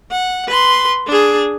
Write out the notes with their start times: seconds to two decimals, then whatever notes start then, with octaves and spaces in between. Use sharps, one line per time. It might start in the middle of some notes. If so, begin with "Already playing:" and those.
0.11 F#5
0.48 B4 C6
1.07 D4 G#4